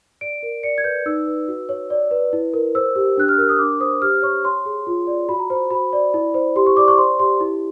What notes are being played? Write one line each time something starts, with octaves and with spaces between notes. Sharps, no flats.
D5 D7
A#4
D5 C#7
G#6
B4 G6
D#4 E6
B4
F#4
C#5
D5
B4
E4
A#4
C5 E6
G4
D4 F#6
F6
A#4 E6
D#6
D4 D6
C5 D#6
G4 F6
C#5 C#6
C#5 C6
G#4
F4
D5
F#4 B5
A#5
C5 B5
F#4 B5
D5
E4
C5
G4 C6
C#6
D5 D6
C#6
C5 C6
G4 C6
E4